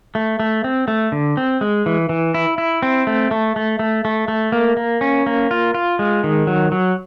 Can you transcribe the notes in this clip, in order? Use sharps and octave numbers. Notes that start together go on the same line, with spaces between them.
A3
A3
C4
A3
D3
C4
G#3
E3
E3
E4
E4
C4
A3
A3
A3
A3
A3
A3
A#3
A#3
C#4
A#3
F4
F4
G#3
D#3
F#3
F#3